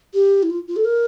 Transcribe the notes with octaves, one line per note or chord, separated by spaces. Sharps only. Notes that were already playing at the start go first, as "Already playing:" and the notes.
G4
E4
F4
F4
A4
A#4